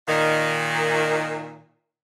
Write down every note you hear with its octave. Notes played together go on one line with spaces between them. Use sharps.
A#2 D#3